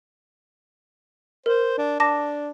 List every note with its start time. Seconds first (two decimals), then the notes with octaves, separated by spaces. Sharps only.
1.46 A#4 C5
1.78 D4
2.00 D4 A5 D6 A#6